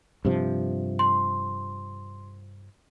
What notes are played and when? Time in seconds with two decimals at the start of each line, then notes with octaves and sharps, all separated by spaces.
0.25 G2 C3 F3
0.99 C6